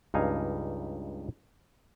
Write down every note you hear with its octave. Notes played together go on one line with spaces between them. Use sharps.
C#2 G2 D#4 F5 G#5